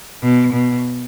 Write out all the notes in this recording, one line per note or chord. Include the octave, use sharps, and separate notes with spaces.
B2
B2